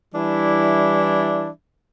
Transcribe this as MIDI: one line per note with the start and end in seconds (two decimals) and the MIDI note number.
0.15 1.49 52
0.15 1.49 55
0.15 1.49 62
0.15 1.49 64
0.15 1.49 74